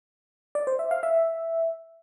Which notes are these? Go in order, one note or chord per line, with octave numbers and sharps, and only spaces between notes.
D5
C5
E5
F5
E5